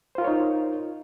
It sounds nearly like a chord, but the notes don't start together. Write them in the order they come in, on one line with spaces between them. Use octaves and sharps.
C5 F4 A#4 C#5 D#4